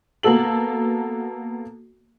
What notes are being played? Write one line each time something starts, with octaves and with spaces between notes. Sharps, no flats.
A#3 B3 F#4 A4 F#7